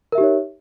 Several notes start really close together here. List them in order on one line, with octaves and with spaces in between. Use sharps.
A#4 E5 G4 D#4 C#5